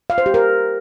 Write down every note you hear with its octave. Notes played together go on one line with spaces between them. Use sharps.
F5
C5
G4
A#4